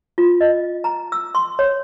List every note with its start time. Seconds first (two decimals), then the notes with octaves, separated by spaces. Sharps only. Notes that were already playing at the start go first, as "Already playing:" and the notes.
0.18 F4
0.41 D#5
0.84 A#5
1.12 E6
1.35 C6
1.59 C#5